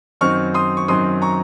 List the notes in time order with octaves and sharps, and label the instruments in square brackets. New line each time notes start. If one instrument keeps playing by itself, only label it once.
[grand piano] F#2 D#3 F#3 C4 D#4 C#6 F6
C6 D#6
C#6
F#2 D#3 F#3 C4 D#4 C6 D#6
A#5 C#6